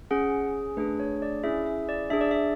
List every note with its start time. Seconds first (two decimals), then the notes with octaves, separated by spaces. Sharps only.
0.11 C#4 G#4 F#5
0.77 A3 D4 G#4 B4
1.00 C#5
1.22 D5
1.44 C#4 E4 G#4 E5
1.66 E5
1.89 D5
2.10 D4 G#4 E5
2.21 D5
2.31 E5